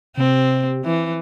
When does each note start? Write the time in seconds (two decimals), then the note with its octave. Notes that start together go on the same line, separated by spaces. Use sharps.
0.17 C3 C4
0.85 E3